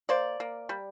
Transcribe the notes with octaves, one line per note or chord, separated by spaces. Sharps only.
A#3 C5 D5
A#3
G3